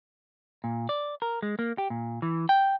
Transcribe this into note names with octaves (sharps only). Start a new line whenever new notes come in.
A#2
D5
A#4
G#3
A#3
G4
A#2
E3
G5